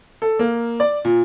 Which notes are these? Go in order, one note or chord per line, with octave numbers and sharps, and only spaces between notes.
A4
A#3
D5
A#2